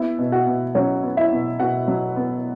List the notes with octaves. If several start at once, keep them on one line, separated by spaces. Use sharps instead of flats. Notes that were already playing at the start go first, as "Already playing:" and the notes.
Already playing: B3 E4 E5
B2
F#4 F#5
B2
F#3 C#4 C#5
B3
E4 E5
B2
B2 F#4 F#5
F#3
B3